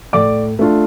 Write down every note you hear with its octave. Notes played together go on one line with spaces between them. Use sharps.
A2 D5 D6
A3 D4 F4